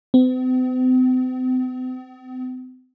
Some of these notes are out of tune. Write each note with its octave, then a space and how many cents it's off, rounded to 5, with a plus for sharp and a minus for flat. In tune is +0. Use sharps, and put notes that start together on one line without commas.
C4 -45